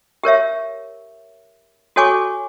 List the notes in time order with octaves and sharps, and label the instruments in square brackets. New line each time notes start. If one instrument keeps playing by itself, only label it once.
[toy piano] G4 A#4 C#5 E5
F#4 A4 C#5 G#5 C#6 D6